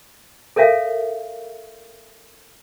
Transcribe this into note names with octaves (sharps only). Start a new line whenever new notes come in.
A4 A#4 C#5 E5 F5